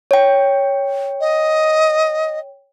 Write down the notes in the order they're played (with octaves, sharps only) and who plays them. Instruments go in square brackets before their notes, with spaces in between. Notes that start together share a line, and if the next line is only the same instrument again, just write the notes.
[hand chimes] C#5 G5
[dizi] D#5